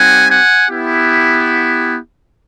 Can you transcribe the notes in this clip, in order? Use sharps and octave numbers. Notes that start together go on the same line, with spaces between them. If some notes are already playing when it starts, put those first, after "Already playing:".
Already playing: G3 C4 D#4 G4 F#5 G#5
F#5 G#5
B3 E4 G4